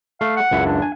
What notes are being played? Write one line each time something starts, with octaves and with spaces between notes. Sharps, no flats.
A3 F5
F#5
C#2 F#2 E4
D4
G#5